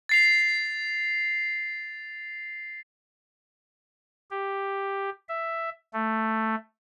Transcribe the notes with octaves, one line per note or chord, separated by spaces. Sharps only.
A6 C7 F7
G4
E5
A3